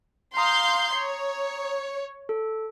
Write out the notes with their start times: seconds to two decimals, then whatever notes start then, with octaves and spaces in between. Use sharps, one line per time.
0.37 F5 A#5 C6 D#6 G6
0.92 C#5
2.29 A4